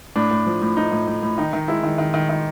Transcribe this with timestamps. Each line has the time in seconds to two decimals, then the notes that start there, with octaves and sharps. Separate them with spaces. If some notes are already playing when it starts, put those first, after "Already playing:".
0.16 A2 D4
0.31 A2
0.47 F3
0.62 A2
0.77 A2 D#4
0.92 A2
1.07 A2
1.23 A2
1.38 D#3 D#4
1.53 D#3
1.68 G#3 E4
1.84 D#3
1.98 D#3
2.14 D#3
2.29 D#3